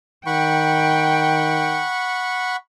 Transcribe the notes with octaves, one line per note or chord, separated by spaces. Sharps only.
D#3 F#5 G5 B5 C#6